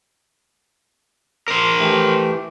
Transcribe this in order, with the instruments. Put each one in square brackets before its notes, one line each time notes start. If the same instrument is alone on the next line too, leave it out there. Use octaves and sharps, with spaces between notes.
[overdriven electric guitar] A#4 C5
[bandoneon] E3 A3 G4